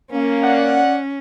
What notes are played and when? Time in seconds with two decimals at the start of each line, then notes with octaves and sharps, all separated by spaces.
0.11 A#3 C#4
0.43 D5 F#5